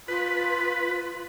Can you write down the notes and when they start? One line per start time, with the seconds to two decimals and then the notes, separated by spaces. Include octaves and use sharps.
0.08 F4 B4